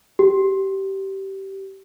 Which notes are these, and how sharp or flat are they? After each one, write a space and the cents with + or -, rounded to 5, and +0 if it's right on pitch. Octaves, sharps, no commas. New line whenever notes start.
G4 -20